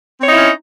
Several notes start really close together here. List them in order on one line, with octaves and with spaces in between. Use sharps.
C4 C#5 D#4 E4 C#4